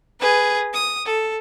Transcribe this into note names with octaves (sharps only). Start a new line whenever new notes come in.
G#4 B4
D#6
A4